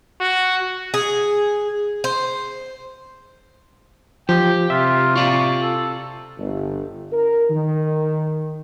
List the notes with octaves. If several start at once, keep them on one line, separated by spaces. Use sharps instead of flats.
F#4
G#4
C5
F3 G4 G5
C3 F4 E5
F4 D5 C#6
A4
G1
A#4
D#3